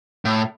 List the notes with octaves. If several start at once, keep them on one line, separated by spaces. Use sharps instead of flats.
A2